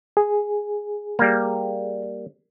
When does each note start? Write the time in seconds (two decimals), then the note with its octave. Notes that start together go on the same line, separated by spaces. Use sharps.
0.17 G#4
1.19 G3 A#3